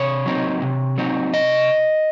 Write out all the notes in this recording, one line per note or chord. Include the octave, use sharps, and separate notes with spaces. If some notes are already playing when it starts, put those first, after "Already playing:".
Already playing: C3 C#5
F#3 C4 D#4
C3
F#3 C4 D#4
C3 D#5